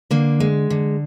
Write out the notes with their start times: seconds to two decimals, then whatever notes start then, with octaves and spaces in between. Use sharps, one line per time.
0.11 D3 A#3
0.40 G#3
0.70 D3